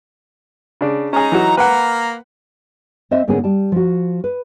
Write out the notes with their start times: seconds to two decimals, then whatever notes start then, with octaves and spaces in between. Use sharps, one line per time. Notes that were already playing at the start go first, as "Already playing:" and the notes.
0.81 C#3 D4
1.13 C#4 D#4 G#4 A#5
1.32 E3 F#3 F#4
1.57 A#3 A#4 B4 F#5
3.11 C4 C5 D#5 E5
3.27 G#2 D3 A#3 B3 C#4 G#4
3.44 G3 A5
3.72 F3 F#4
4.24 B4